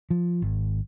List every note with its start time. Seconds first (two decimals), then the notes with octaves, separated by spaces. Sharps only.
0.10 F3
0.42 G#1